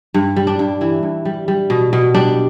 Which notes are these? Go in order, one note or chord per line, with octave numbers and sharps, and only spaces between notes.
G2
G3
D4
G2
E3 E4
G2
G3
G3
B2
B2
G3 D4